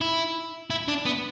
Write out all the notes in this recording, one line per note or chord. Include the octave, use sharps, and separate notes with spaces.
E4
E4
D4
B3